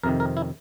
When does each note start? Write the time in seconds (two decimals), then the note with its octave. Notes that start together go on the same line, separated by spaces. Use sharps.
0.03 F2 C3 D#3 A#4
0.20 A#4
0.37 E4